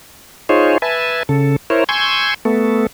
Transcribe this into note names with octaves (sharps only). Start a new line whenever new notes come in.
D#4 F4 G#4 C5 C#5
B4 E5 G#5 A5
C#3 A4
E4 A#4 C5 C#5
G#5 C6 C#6 E6 G6 G#6
A3 B3 A4